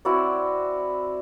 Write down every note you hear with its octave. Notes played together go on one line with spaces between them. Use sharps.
C4 E4 F#4 D5